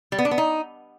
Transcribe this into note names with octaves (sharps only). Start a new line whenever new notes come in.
G3
B3
D4
B3
D#4